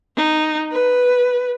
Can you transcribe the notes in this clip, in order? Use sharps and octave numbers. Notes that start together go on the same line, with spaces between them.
D#4
B4